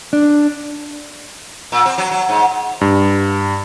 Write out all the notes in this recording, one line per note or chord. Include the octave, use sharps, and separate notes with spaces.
D4
A#2
C4
F#3
F#3
G#2
G2